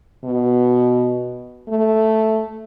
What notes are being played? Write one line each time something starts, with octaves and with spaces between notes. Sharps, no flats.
B2
A3